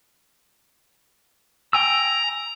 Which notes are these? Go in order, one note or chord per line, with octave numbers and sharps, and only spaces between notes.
G5 G#5 A#5 E6